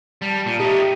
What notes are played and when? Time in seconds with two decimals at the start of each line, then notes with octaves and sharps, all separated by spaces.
0.22 G3 A5
0.46 A#2
0.59 A3 D#4 G4